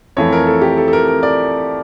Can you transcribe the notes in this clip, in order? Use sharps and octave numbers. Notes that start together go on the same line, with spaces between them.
F2 E3 A3 C#5
A#4
A4
G4
A4
A4
A#4
A#4
D5